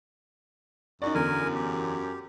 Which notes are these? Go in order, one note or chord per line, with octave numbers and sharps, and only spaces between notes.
F#2 D#4 F#4 D5
E2 D3 A#4 G#5
G4